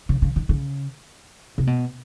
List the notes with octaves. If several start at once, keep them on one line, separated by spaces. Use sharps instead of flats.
C#3
C#3
D3
C#3
C3
B2